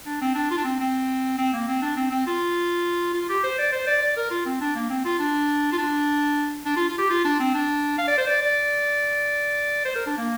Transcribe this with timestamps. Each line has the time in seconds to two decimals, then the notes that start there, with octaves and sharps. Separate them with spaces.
0.06 D4
0.21 C4
0.35 D4
0.51 F4
0.57 D4
0.64 C4
0.80 C4
1.38 C4
1.53 A#3
1.68 C4
1.82 D4
1.96 C4
2.11 C4
2.27 F4
3.14 F4
3.29 G4
3.44 C5
3.59 D5
3.72 C5
3.87 D5
4.02 D5
4.17 A#4
4.31 F4
4.46 C4
4.61 D4
4.75 A#3
4.90 C4
5.05 F4
5.19 D4
5.72 F4
5.78 D4
6.66 D4
6.77 F4
6.88 F4
6.99 G4
7.10 F4
7.25 D4
7.40 C4
7.54 D4
7.98 F5
8.08 D5
8.18 C5
8.27 D5
8.42 D5
9.85 C5
9.96 A#4
10.06 D4
10.18 A#3